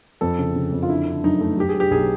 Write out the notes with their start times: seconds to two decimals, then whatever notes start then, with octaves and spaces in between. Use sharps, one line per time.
0.21 F2 A4
0.39 C#3
0.56 C#3
0.72 F2
0.83 F4
0.89 D3 E4
1.07 D3
1.24 F#2 D#4
1.41 A3
1.57 F#3 G4
1.69 G#4
1.75 F#3
1.80 G4
1.91 B1 G#4